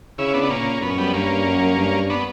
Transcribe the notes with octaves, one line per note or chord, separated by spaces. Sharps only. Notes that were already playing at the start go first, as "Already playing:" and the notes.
C#3 C#4 E4
B3 D4
B3
A#2 A#3 C#4
F#2 B3
C#4
G3 B3
G2 A#3 C#4
F#2
G2
B3 D4